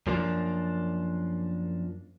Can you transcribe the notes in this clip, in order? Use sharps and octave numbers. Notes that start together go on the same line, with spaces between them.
F#2 F3 A#3 D4